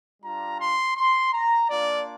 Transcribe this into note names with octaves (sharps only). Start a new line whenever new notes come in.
G3 D4 F4 A#5
C6
C6
A#5
A#3 D4 F4 D5